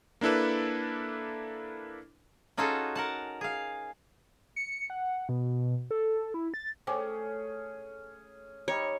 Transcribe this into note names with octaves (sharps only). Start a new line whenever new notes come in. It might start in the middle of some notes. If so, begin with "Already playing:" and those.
A#3 D4 E4 A4 B4
C#4 D#4 F4 F#4 G#4 A4
A#4 F#5 A5
G#4 F5
C#7
F#5
B2
A4
E4
A6
A3 C#4 G#4 A4 C5 G5 D6
G3 D#4 C#5